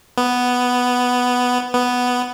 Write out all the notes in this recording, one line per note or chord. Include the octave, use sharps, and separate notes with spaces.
B3
B3